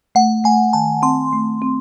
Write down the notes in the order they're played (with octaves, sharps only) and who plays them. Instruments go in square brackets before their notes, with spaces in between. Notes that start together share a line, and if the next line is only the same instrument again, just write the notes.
[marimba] A3 [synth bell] F#5
[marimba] A3 [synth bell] G#5
[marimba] D#3 [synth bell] A5
[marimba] C4 [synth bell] C6
[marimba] A3
C4